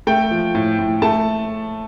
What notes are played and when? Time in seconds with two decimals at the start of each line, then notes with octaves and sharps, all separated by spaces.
0.07 A3 G5
0.31 F3
0.55 A2
0.79 A2
1.02 A3 A5